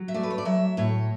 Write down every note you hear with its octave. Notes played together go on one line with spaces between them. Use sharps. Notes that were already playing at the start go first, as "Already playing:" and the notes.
Already playing: F#3
E5
A3 D5
B4
C#5
D5
F#3 E5
A2 C#5